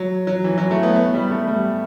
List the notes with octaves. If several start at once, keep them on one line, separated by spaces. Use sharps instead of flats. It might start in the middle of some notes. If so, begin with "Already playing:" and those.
Already playing: F#3
F#3
E3
F#3
A3
B3
B3
G3
A3
G3